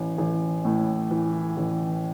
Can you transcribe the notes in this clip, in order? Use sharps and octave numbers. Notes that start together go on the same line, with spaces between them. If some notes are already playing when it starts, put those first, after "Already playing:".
Already playing: A1
A1
A2
E3
A1